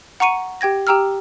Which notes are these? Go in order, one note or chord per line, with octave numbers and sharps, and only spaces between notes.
F#5 A#5 C#6 C#7 D#7
G4 G5 G#6 A#6
G4 G5 A#5 E6 F6